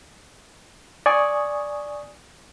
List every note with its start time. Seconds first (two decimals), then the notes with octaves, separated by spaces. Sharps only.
1.06 D5 G#5 C#6 D#6